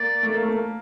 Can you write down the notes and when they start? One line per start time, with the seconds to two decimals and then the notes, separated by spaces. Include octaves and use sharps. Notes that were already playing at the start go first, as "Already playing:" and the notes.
Already playing: A#3 D5
0.23 A3
0.33 A#3
0.43 A3
0.53 A#3